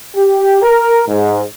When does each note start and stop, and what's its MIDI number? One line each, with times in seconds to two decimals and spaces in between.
0.16 0.57 67
0.61 1.02 70
1.06 1.41 44